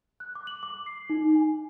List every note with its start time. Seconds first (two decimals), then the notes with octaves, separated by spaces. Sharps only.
0.20 F#6
0.35 D6
0.47 F#7
0.63 D6
0.86 C7
1.10 D#4
1.35 G#5